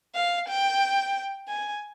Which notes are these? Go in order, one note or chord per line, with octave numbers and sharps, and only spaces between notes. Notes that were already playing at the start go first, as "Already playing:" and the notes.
F5
G5
G#5